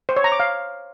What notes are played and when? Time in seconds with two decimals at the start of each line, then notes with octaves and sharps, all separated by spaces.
0.09 C5
0.16 C#5
0.24 A#5
0.32 D6
0.40 F5